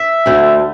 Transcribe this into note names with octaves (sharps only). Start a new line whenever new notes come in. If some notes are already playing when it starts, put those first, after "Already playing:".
Already playing: E5
D2 D3 A3